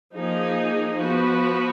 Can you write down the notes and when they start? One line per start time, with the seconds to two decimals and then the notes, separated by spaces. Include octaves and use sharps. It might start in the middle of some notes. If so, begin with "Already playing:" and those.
0.14 F3 A#3 D#4 G#4
0.98 F3 B3 F#4 B4